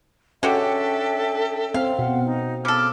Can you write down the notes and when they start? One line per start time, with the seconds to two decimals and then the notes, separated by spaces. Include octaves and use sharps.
0.43 G#3 C#4 D4 F#4 G4 A4 E5 G5
1.74 C4 F5
1.99 B2 F#5
2.24 D#4
2.65 C#3 A4 D6 F6